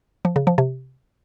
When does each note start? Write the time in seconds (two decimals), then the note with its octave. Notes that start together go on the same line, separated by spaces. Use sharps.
0.25 F3
0.36 C#3
0.47 F3
0.58 C3